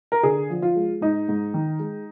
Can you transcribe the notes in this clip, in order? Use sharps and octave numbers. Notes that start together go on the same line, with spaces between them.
A#4
D3 G#4
F3
F4
G#3
G#2 D#4
G#2
D#3
G#3